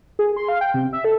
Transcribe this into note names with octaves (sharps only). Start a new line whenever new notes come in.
G#4
C6
F5
G5
C3
E5
A4